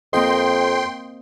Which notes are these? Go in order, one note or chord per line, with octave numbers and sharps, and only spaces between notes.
F2 A#3 C4 D#5 G5 C6